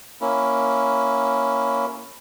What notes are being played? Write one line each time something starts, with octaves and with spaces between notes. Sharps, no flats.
A#3 C#4 E4